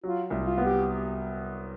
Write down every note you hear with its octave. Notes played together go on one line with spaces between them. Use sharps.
F#3 F4
C2
F4
B3
G4